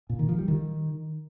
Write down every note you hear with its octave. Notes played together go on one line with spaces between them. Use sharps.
A#2
D#3
F3
G3
D#3